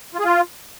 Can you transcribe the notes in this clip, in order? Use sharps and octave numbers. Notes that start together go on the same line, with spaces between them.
F4
G#4
F4